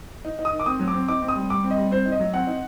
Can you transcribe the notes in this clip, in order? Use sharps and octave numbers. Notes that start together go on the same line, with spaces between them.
D#4
D#4
D#6
D#3
D6
C4 D#6
F#3
D6
C4
D#4 D6
C4
D#6
G3
G3 D6
C4
D#5
G3
C4 C5
D#4
D#5
F#3
C4 F#5
D#4